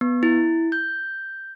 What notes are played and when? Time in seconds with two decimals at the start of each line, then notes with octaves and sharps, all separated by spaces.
0.01 B3
0.23 E4
0.72 G6